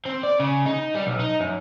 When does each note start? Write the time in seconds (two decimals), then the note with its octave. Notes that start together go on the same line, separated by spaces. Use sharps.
0.05 C4
0.23 D5
0.40 C#3
0.66 D#4
0.95 G3
1.07 B1
1.20 D#4
1.41 F#2